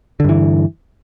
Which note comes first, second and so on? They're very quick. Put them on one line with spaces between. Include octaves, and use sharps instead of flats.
D3 G2 E3